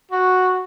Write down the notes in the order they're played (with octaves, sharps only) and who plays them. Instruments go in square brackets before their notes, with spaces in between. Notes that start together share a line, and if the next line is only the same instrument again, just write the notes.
[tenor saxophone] F#4